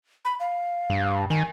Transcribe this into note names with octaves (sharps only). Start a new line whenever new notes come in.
B5
F5
G2
D#3 G#5